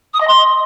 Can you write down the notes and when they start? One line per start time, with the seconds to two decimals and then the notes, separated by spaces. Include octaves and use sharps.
0.14 D#6
0.21 D#5
0.27 C6